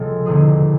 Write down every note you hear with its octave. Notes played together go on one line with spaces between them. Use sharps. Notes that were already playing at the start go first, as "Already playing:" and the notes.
Already playing: C#2 C3 F3 G#3 A4
E1 D#2 D3 G#4